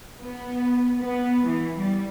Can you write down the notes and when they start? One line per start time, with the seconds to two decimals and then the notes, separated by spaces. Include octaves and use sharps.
0.20 B3
1.00 B3
1.47 E3
1.78 G3